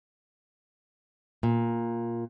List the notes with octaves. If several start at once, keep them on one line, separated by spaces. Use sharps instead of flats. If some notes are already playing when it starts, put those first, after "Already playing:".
A#2